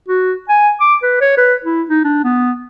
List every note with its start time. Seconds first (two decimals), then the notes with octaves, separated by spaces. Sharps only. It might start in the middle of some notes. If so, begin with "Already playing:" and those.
0.08 F#4
0.49 G#5
0.80 D6
1.03 B4
1.21 C#5
1.37 B4
1.64 E4
1.89 D#4
2.04 D4
2.24 B3